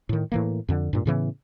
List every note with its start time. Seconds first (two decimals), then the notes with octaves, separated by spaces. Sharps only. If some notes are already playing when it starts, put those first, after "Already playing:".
0.09 A2 D#3
0.32 A2 E3 A#3
0.69 F2 D3
0.93 G2 A#2
1.06 A2 C#3 E3 B3